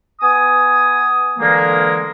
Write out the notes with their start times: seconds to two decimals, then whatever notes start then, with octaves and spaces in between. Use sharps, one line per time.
0.21 B3 G#5 D#6
1.39 D3 E3 G#3 A#3